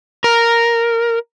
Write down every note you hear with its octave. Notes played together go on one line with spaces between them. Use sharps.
A#4